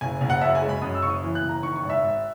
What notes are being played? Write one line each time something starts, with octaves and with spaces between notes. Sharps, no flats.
F#1 G#5
F#1
F#5
F#2 E5
G#5
G#3
B5
F#2 D#6
E6
F#1 C#6
D#6
E3
F#6
F#1
A#5
D#3 C#6
C#6
G#1
E5
G#1